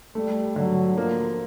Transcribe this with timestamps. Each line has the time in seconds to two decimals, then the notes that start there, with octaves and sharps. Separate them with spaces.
0.15 G3 A3
0.56 D3 F#3
0.96 F3 A#3